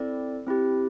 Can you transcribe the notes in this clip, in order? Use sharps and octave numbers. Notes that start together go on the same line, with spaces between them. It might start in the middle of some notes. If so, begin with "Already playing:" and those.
Already playing: C4 E4 A4 D5
C4 E4 G4